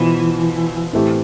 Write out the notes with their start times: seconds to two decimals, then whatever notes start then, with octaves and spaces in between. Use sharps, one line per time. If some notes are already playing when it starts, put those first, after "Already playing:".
Already playing: B2 E3 B3 F4 C5
0.93 A2 E3 A3 C4 G4